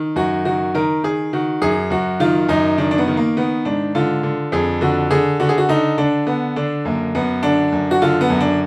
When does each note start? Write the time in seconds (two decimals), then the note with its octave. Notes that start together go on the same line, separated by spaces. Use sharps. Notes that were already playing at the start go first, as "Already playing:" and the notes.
Already playing: D#3
0.16 F#2 F#4
0.45 D#3 F#4
0.75 D#3 A#4
1.04 D#3 G#4
1.33 D#3 F#4
1.62 F#2 G#4
1.90 F#2 F#4
2.20 D#3 F4
2.49 F#2 D#4
2.78 D#3 D4
2.91 D4
2.98 B3
3.08 D#3
3.17 A#3
3.37 D#3 B3
3.65 G#2 D4
3.95 D3 F4
4.23 D3
4.52 F2 G#4
4.81 D3 F#4
5.11 D3 G#4
5.40 D3 F#4
5.49 G#4
5.58 F#4
5.69 D3 D#4
5.98 D3 D4
6.26 D3 B3
6.56 D3 D4
6.85 F#2 A#3
7.15 F#2 B3
7.43 D3 D4
7.72 F#2
7.91 F#4
8.02 D3 F4
8.21 B3
8.30 F#2
8.40 D4